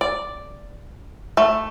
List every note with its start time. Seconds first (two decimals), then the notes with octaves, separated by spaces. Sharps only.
0.01 D5
1.37 A3